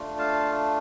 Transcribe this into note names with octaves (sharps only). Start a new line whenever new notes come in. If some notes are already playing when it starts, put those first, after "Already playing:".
Already playing: A3 D4 F4
F5 A5